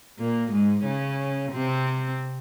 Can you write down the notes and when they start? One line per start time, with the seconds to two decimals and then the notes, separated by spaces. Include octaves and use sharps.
0.18 A#2 A#3
0.51 G#2 G#3
0.85 C#3 C#4
1.52 C3 C4